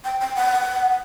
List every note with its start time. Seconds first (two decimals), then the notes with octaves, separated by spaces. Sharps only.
0.05 G5
0.21 G5
0.36 F#5